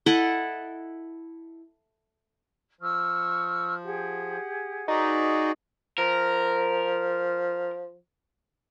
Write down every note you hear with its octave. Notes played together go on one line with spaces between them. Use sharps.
E4 A4 D#5 F#5
F3 C#6 E6 F6
G4 G#4 F#5
D#4 F#4 G#4 A4 B4 D5
F3 A#4